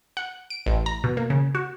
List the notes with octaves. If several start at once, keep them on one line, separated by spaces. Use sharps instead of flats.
F#5
D7
A1
A#5
B2
A#3
C#3
F#4